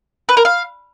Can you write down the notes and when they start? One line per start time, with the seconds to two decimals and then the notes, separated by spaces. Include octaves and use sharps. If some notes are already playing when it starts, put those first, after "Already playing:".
0.29 B4
0.37 A#4
0.45 F5